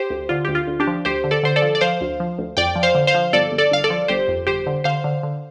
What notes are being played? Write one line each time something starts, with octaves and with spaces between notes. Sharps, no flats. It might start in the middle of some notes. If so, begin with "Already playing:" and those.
Already playing: G4 C5
D2
D3 F4
D2 G4
F4
D2
D4 G4
F3
D2 G4 C5
D3
A4 D5
D3 C5
A4 D5
F3
D5
F3 C5 F5
D2
F3
D2
F2 D5 G5
F3
C5 F5
D3
C5 F5
F3
G1 A4 D5
G1
A4 D5
G1 F5
A4 D5
F3
G1 G4 C5
F2
G1 G4 C5
D3
D3 C5 F5
D3
D3